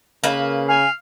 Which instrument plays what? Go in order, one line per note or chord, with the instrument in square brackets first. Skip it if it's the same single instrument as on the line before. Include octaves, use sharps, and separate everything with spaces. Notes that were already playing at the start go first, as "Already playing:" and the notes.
[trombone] C#3 [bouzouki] A#3 B4
[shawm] F5 [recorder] G#5